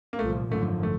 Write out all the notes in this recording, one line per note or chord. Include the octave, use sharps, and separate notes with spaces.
A#3
C2 A#2 F3 A3
G#1 F#2 D3 F3 A3
A3